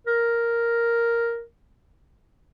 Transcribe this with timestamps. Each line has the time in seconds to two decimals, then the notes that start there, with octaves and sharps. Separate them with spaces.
0.07 A#4